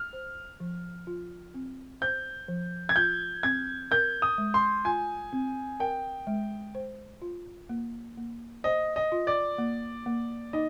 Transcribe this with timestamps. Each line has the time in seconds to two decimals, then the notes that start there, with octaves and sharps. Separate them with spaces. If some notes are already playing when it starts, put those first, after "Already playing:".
Already playing: F6
0.13 C5
0.60 F3
1.07 F4
1.54 C4
2.01 C5 G6
2.48 F3
2.89 G#6
2.96 F4 G6
3.43 C4 G#6
3.91 A#4 G6
4.22 D#6
4.38 G#3
4.54 C6
4.85 F4 G#5
5.33 C4
5.80 A#4 G5
6.27 G#3
6.75 C5
7.22 F4
7.69 A#3
8.17 A#3
8.64 C5 D#5
8.96 D#5
9.12 F4
9.27 D5
9.58 A#3
10.06 A#3
10.53 D#4 D#5